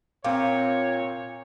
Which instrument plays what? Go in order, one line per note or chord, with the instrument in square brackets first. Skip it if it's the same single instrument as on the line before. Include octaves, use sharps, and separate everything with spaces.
[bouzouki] A#2 [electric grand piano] C4 G5 D6 [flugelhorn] C#5 [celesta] F5